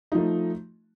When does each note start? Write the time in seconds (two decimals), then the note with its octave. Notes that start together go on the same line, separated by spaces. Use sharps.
0.12 D#4
0.15 F3
0.18 A3